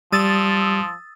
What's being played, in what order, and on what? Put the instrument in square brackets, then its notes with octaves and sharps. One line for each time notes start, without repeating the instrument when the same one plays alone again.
[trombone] F3 [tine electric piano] G3 [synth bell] D#6 E6 A6